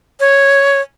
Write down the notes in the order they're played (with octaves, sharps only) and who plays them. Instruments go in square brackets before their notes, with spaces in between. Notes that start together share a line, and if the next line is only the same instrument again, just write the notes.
[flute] C#5